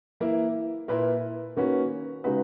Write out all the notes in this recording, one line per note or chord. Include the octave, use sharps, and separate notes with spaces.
E3 A#3 E4
A#2 A#3 E4 B4
D#3 A#3 C#4 F#4 B4
C#3 G#3 D#4 F#4 B4